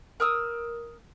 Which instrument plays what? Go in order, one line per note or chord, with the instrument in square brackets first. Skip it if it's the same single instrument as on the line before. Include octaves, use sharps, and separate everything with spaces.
[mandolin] A#4 D#6 E6